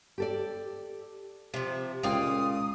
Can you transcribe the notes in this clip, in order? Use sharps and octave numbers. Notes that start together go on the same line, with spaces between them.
G4 A4 D5
C3 F3 E5
C#2 A#2 F5 G5 D#6